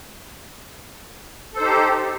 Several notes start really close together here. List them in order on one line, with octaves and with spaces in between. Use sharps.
A4 C5 D#4 G4